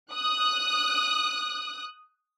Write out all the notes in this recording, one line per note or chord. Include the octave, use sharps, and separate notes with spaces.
D#6 F#6